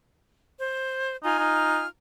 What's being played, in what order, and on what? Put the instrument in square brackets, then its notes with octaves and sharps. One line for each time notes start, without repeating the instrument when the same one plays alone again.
[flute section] C5
[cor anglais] D#4 [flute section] F4 G#5 F6
[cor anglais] D#4